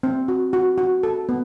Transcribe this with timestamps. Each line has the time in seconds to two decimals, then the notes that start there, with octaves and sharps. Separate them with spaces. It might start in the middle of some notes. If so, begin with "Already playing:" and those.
0.03 C4
0.28 F#4
0.53 F#4
0.78 F#4
1.03 A4
1.29 B3